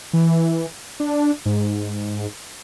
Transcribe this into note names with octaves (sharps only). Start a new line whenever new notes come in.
E3
D4
G#2